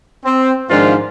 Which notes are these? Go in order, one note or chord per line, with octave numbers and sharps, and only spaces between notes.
C4
G#2 D#3 F3 D4 F4